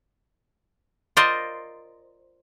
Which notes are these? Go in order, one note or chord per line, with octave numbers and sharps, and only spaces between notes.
F4 A#4 C5 D5 D#5